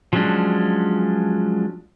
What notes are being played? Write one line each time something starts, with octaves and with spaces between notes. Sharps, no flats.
F3 F#3 G#3 C#4 D4